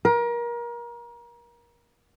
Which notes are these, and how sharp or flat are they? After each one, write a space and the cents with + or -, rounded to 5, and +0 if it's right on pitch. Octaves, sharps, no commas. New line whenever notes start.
A#4 +30